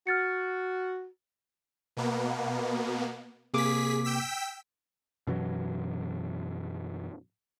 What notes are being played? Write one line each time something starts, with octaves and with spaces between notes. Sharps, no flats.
F#4 F6 A6 C#7
B2 A#3 B3
C3 A#3 G#4 D6 B6
G5 E6 B6
F#2 B2 E3 F#3